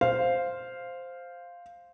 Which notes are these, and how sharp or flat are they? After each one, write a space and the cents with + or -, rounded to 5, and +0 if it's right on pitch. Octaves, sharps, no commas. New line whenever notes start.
C5 +0 F5 +0